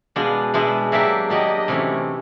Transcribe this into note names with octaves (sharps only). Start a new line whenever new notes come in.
B2 G#3 B3 D4 F5
B2 G#3 B3 D4 E5
F#3 A#3 D4 G4 E5
F#3 A#3 D4 G4 D#5
C3 E3 A3 C#4 E4